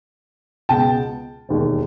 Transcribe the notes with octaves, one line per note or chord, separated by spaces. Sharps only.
C#2 B2 G#3 B3 G5 A5
E1 D#2 D#3 G#3